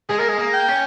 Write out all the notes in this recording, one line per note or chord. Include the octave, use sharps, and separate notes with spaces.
G#3 G#4
A#3 A#4
G#3 G#4
A#3
G5
C#4